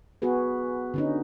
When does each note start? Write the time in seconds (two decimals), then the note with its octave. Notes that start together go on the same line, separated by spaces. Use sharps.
0.22 B3 F#4 G#4 B4
0.94 D3 C#4 D#4